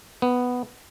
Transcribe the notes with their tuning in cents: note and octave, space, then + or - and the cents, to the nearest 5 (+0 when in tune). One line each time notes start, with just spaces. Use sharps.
B3 +0